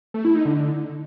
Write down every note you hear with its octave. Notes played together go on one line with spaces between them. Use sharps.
A3
E4
D#4
D3